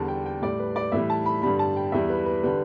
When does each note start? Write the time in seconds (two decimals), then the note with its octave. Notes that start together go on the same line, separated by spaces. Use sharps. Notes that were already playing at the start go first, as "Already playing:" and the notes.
Already playing: E2 D3 G3 A5
0.08 G5
0.26 G5
0.42 A2 G3 D5
0.60 B4
0.76 D5
0.92 A2 E3 G3 E5
1.10 A5
1.26 B5
1.42 G2 D3 G3 B5
1.59 A5
1.76 G5
1.92 E2 E3 G3 E5
2.10 B4
2.26 B4
2.44 D3 G3 B4